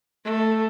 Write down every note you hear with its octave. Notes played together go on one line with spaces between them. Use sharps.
A3